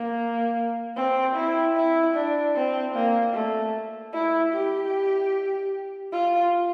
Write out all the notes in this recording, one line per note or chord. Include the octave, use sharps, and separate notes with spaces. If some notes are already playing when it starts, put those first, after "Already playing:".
Already playing: A#3
C4
E4
E4
D4
C4
A#3
A3
E4
G4
F4